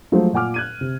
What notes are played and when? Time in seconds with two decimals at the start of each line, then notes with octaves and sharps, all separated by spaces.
0.12 F3 F#3 G#3 A3 G#4 C5
0.33 A#2 F#5 G#5 D6 F6
0.54 F#6 G#6 D#7
0.81 C3